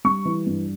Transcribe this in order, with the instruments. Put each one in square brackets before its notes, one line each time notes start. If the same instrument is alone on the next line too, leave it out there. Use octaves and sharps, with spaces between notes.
[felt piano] G3 [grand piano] C#6
[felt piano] E3
G2